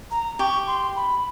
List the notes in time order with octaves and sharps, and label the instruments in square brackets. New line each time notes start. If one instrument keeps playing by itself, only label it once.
[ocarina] A#5
[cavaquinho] G4 [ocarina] C#6
[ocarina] C6
B5